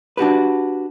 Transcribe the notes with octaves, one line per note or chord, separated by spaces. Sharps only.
D4 F#4 G4 B4